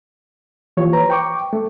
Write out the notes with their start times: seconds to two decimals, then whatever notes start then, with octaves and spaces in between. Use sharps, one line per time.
0.77 E3 F3 A#3 F4 G4 C#5
0.93 B4 C5 A#5
1.10 G5 C#6 D6
1.53 A3